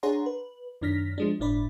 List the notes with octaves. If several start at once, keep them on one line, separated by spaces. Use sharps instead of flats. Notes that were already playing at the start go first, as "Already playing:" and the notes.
D4 G#4 C#5 F#5 A#5 C6
B4
F#2 D#3 D4 F6 A#6 B6
F3 G#3 D4
G1 A2 D4 D5 B5